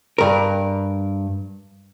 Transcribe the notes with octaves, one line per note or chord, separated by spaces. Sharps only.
G2 A#4